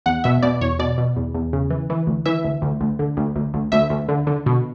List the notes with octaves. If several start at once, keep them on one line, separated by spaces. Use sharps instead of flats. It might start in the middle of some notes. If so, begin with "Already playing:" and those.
E2 F#5
B2 E5
B2 D5
E2 C#5
B2 D5
B2
E2
E2
C#3
E3
E3
D2
E3 E5
D2
D2
D2
D3
D2
D2
D2
D2 E5
D2
D3
D3
B2